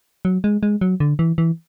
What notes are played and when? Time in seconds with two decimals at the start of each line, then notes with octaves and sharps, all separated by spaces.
0.25 F#3
0.44 G#3
0.63 G#3
0.81 F#3
1.00 D3
1.19 E3
1.38 E3